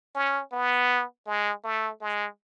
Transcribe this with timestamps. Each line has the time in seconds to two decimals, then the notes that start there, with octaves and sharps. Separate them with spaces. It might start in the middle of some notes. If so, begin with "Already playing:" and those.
0.15 C#4
0.52 B3
1.26 G#3
1.64 A3
2.01 G#3